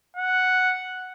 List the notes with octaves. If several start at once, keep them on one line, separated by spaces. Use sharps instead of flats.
F#5